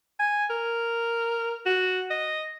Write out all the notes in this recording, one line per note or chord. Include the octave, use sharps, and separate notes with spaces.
G#5
A#4
F#4
D#5